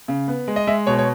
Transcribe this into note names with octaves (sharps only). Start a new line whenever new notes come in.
C#3
B3
G#3
D#5
G#3 E5
B2 C#5
C#5